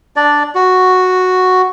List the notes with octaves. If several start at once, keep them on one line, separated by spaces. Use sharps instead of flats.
D4 D5
F#4